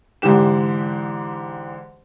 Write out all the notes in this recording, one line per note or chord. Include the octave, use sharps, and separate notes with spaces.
G#2 D3 E3 G4 E7